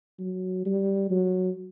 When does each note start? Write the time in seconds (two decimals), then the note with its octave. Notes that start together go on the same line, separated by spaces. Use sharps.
0.19 F#3
0.65 G3
1.10 F#3